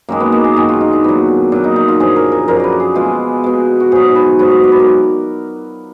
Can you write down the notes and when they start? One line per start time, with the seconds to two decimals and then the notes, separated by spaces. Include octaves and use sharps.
0.09 F#2 D#3 G#3 A#3
0.20 B3
0.32 A#3
0.44 G#4
0.56 F#2 D#3 G#3 F#4
0.69 F4
0.81 D#4
0.93 D4
1.04 A#2 F#3 B3
1.52 A#2 F#3 D4
1.64 D#4
1.76 D#4
1.88 F4
2.00 F#2 D3 F3 G#4
2.16 A#4
2.32 A#4
2.48 F#2 D3 F3 A#4
2.60 B4 D5
2.80 G#4
2.95 B2 G#3 F4
3.44 B2 G#3
3.80 F#4
3.92 G#2 F#3 G#4
4.16 B4
4.39 G#2 F#3 B4
4.64 D5
4.72 B4
4.79 A#4